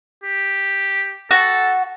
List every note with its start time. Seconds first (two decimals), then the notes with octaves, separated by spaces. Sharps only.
0.24 G4
1.31 F#4 A4